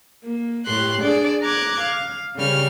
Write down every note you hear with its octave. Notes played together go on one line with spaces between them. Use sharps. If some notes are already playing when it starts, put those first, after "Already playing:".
A#3
A2 G4 C6 F#6
D4 G#4 D5
A#5 D6 F#6 G#6
F5
C#3 G3 F6